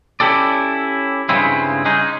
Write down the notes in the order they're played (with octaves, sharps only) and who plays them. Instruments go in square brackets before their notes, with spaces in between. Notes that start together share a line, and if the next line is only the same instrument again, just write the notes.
[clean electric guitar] C#4 E4 G4 A4 D5
G2 C#3 G#3 C4 E4
G#3 C#4 D#4 G#4